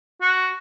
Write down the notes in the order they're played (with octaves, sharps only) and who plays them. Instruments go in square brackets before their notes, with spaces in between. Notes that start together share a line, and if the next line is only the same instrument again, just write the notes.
[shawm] F#4